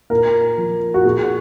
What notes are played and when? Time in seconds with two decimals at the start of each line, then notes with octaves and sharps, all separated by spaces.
0.10 A#2 A#4
0.58 F3
0.94 F#4
1.05 A#2 G#4